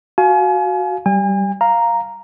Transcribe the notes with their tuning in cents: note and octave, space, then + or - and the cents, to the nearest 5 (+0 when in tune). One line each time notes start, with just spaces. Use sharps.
F#4 +0 F5 +5 G#5 +35
G3 -15 G#5 -40
F5 +0 A#5 +0